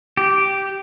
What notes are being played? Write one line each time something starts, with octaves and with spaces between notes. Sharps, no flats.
G4